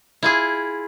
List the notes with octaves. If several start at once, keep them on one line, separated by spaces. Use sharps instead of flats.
E4 F4 G#4